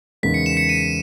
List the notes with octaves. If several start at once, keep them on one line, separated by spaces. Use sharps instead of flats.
E2 C#3 G#3 D#4 A#4 B6
C#7
E7
C#7
D#7